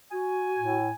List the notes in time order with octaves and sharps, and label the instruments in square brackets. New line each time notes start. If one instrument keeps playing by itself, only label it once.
[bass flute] F#4 [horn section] G#5
[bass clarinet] A2